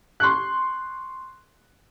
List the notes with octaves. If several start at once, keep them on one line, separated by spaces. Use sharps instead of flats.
C6 C#6 F#6